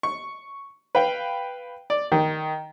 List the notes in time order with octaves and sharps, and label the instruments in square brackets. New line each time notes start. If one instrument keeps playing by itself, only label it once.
[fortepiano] C#6
B4 F5 G5
D5
D#3